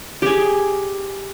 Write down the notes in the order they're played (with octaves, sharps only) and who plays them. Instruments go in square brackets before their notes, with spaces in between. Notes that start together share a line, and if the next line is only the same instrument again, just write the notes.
[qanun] G4 G#4